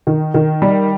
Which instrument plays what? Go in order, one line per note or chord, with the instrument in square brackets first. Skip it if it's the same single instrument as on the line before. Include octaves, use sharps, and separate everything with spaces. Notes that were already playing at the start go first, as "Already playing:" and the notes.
[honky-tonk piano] D#3
D#3
G3